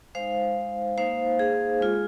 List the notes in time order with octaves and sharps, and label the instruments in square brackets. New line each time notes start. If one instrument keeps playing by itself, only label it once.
[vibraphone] G#3 D#4 C5 F5
A#3 D#4 C5 F5
G#4
G#3 F4